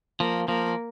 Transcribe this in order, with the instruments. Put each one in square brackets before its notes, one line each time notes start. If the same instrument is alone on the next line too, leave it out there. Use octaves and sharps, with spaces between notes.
[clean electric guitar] F3 [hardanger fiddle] A#3
[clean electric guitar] F3 [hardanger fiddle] A#3